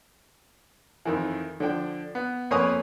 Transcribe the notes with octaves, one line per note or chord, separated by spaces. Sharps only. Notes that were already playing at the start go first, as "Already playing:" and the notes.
F2 D#3 E3
D3 F3 D4 G5
B3
F2 A#3 B4 C#5 G#5 D#6